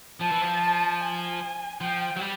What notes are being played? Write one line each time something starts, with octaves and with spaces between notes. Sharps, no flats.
F3 A5
E3
F3
G#5
F3 G5
F#3
G3